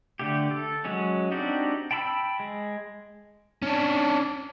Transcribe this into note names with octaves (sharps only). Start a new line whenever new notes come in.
D3 A3 G4
A4
F#3 G#3 C#4
C4 D4 D#4 F#4 G4
G5 A5 B5 C6 E6
G#3
C#4 D4